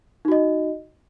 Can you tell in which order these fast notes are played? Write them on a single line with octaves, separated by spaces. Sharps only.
D#4 F#4 D#5